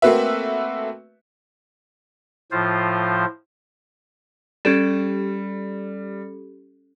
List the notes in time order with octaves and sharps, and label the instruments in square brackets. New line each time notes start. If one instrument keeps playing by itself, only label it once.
[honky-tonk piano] A3 A#3 C4 F#4 B4 E5
[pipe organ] A2 F3 F4 C5
[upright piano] G3 [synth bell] C#4 G4 A4